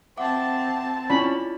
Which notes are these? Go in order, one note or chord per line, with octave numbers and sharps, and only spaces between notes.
C4 E5 F#5 A5 D6
C#4 E4 F4 D5 B5